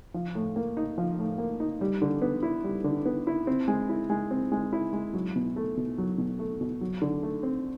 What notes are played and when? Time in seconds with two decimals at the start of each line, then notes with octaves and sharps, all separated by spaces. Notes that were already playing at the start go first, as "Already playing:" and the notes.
0.14 F3
0.35 A2
0.56 A#3
0.77 D#4
0.98 F3
1.19 A2
1.38 A#3
1.60 D#4
1.81 G3
2.02 D3
2.22 B3
2.43 E4
2.64 G3
2.84 D3
3.06 B3
3.27 E4
3.47 C4
3.68 G#3
3.89 E4
4.10 G#3
4.31 C4
4.52 G#3
4.73 E4
4.93 G#3
5.14 F#3
5.36 B2
5.56 A3
5.77 B2
5.98 F#3
6.18 B2
6.39 A3
6.61 B2
6.81 F#3
7.02 D3
7.23 A3
7.43 C4